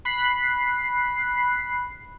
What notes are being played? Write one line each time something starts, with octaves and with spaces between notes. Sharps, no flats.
B5 F#6 C7